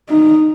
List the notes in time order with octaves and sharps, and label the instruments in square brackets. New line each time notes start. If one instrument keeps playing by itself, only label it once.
[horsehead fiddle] D#4